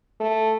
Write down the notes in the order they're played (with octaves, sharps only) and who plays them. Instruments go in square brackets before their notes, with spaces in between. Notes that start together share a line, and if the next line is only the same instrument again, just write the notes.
[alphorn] A3